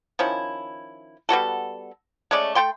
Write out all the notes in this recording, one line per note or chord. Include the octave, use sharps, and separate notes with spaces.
D#3 F3 C#4 E4
G3 B3 F#4 A4
G#3 A3 C#4 D5
A3 A4 G5 C6